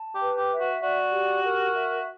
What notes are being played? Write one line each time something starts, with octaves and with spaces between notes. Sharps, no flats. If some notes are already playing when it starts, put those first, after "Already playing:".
Already playing: A5
G4
B4
G4
E5
F#4
F#4 D5
G4
A#4
E5